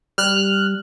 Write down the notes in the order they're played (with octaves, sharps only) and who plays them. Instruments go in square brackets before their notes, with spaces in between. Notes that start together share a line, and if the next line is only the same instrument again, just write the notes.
[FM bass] G3 [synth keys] F6 F#6